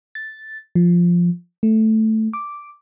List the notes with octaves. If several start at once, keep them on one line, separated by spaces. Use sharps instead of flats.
A6
F3
A3
D6